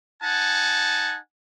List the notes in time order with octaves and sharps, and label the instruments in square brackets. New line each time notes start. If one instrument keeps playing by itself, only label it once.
[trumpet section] D#4 F#5 G#5 A5